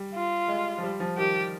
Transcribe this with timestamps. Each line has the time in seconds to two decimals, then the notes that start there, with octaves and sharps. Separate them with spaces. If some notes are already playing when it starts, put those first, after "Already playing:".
Already playing: G3
0.15 F4
0.48 G#3
0.78 F3
0.83 G3
1.00 F3
1.17 D#3 G4